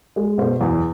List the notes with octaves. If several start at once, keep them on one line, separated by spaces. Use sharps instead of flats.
G#3
B2 C5
E2